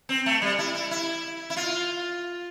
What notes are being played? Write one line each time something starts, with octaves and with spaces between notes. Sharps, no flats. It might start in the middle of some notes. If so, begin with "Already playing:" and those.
C4
A3
G3
E4
E4
E4
E4
F4